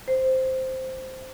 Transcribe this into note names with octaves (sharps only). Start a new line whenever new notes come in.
C5